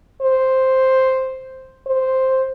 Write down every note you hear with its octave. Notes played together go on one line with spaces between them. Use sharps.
C5
C5